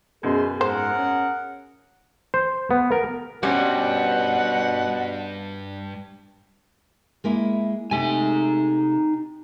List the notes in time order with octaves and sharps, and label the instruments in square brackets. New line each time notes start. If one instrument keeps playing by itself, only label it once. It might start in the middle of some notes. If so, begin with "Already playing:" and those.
[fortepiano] F#2 B2 [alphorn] G#4 [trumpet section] B4 C5 C6
[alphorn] G#2 [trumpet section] G#4 A#4 F#5 [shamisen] C5
[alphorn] C#4
[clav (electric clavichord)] C5
B3
A#4
[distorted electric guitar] C#2 G2 [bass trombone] B2 [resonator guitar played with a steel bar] G3 C4 C#4 [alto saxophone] F#5
[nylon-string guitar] G#3 A#3 E4
[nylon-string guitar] C3 A3 [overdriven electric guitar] D#4 G#5